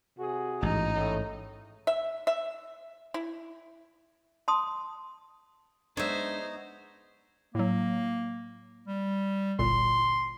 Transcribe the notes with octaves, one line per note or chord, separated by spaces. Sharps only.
C3 F#4 G#4
A1 G#2 D#4
A2
E5
E5
E4
A5 C6 D#6
G#3 B3 D4 D#4 C5 C#5 D#5 E5
A2 F#3 A#3
G3
G1 C2 A#2 C6